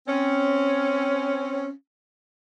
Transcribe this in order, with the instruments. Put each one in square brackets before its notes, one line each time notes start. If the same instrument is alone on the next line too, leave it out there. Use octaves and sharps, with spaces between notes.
[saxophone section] C4 C#4